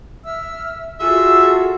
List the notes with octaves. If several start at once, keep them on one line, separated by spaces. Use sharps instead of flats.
E5 E6 F6
F4 F#4 G#4 A4 E5